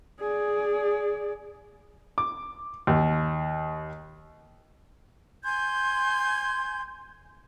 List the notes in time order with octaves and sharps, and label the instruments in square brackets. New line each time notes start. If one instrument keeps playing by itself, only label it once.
[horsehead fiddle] G#4 D5
[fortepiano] D6
D#2
[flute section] G#5 C6 G6 G#6